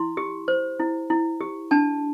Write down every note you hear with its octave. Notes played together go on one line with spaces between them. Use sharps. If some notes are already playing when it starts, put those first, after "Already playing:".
Already playing: E4 C6
G4
C5
E4
E4
G4
D4 A5